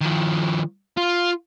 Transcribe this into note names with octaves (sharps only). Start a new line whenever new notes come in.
D#3 F3
F4